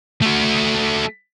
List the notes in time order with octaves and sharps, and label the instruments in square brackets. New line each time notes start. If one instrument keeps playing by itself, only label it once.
[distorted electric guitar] A3 F#4